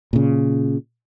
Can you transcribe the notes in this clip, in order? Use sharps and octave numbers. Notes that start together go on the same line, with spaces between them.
A#2 C#3